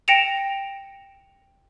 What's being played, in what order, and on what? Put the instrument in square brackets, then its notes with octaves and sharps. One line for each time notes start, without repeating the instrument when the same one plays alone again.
[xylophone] G5 A#6 C#7 D7 E7 F7